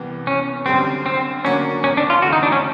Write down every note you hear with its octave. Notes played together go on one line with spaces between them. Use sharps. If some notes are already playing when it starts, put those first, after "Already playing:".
Already playing: C2 C3 E3 G3 B3
C#4
F#2 D3 G3 C4
C4
D3 F#3 A#3 C#4 D4 F#4
C#4
D4
F4
D2 C#3 E3 A3 F#4
D#4
D4
C#4